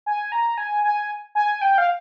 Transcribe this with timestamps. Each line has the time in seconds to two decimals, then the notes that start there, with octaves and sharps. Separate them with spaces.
0.06 G#5
0.32 A#5
0.58 G#5
0.84 G#5
1.35 G#5
1.61 G5
1.78 F5